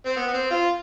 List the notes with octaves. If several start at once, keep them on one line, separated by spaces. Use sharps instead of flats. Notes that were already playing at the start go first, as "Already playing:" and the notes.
C4
B3
B3
C4
F4